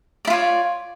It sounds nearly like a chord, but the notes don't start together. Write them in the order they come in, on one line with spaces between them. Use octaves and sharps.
D5 E4 F4 C#5